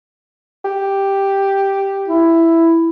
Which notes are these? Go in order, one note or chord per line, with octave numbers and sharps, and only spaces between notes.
G4
E4